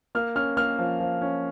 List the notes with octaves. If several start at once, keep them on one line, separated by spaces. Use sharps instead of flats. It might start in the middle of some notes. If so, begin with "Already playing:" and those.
A#3 F6
C#4 F6
A#3 F6
F3
F3
C#4